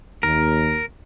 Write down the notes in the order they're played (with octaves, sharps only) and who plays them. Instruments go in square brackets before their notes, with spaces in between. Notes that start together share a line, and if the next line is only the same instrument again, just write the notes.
[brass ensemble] D#2 [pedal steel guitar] A#4